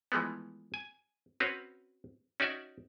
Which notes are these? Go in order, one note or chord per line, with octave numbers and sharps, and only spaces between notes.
E3 F3 G#3 A3 B3
G#5
C4 C#4 F#4 B4 C#5
C#4 D#4 F#4 D5 E5